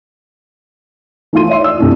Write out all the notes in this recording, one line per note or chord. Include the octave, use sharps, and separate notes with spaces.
E3 A3 D#4 F4 C6 D#7
C#5 E5 C6
D5 E6
C2 C3 A3 C#4 D4 E4